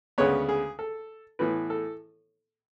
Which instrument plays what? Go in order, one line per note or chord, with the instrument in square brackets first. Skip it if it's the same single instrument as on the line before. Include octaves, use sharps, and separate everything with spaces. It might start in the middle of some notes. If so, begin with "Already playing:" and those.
[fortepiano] D2 C#3 G#3 B3 C#5
G#4
A4
A2 E3 B3 B4
A4